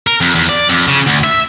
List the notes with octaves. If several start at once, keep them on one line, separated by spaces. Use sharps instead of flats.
A#4
F2
E2
D5
F2
C#3
D2
E5